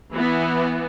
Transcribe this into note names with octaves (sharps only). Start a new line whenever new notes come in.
E3 B3